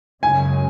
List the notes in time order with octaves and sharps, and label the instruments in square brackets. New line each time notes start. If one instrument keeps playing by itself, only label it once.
[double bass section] F#2 C#3 G#3 [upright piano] G#5